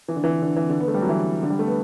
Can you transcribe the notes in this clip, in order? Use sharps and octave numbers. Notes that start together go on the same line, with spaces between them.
E3
D3
E3
D3
E3
D3
B3
A3
G3
F#3
E3
D3
G3
A3
B3